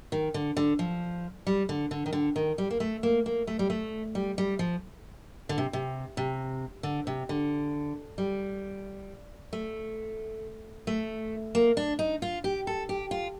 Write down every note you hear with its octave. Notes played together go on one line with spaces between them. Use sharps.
D#3
D3
D3
F3
G3
D3
D3
D#3
D3
D#3
G3
A#3
A3
A#3
A#3
A3
G3
A3
G3
G3
F3
D3
C3
C3
C3
D3
C3
D3
G3
A3
A3
A#3
D4
D#4
F4
G4
A4
G4
F4